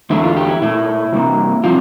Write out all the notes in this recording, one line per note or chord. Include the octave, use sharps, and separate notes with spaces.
E2 D3 A3 E4
F4
G4
E4
A#2 A3 E4
C3 G3 A#3
C3 F3 F4